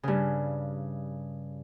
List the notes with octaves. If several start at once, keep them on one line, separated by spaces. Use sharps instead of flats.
G2 C#3